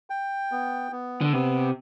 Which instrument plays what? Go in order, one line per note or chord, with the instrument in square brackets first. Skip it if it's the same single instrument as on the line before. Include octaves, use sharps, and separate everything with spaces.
[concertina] G5
B3
B3
[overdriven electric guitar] D3
[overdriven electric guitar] C3 [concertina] B3